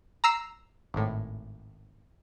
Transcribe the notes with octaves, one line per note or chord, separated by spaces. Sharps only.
A#5 E6 C7
G#1 A2